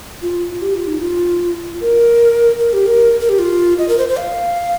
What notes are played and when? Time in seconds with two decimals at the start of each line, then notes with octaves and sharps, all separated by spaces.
0.22 F4
0.54 F4
0.62 G4
0.75 F4
0.87 D#4
1.01 F4
1.81 A#4
2.59 A#4
2.73 G4
2.86 A#4
3.20 A#4
3.29 G4
3.39 F4
3.79 D#5
3.89 A#4
3.98 C5
4.08 C5
4.18 F5